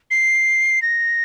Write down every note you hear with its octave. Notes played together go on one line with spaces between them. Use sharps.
C7
A#6